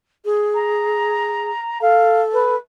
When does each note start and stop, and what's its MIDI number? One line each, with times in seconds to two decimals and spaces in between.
0.25 1.52 68
0.54 1.81 82
1.81 2.55 69
1.81 2.21 77
2.33 2.55 71